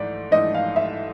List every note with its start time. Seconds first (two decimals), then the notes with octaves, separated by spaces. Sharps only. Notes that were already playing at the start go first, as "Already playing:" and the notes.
Already playing: G#2 E3 A3 D5
0.31 G#2 E3 A3 D4 D#5
0.55 F5
0.76 E5